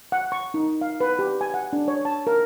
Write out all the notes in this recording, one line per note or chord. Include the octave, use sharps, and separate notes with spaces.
F#5
C#6
D#4
F5
B4
G4
G#5
F#5
D4
C#5
A5
A#4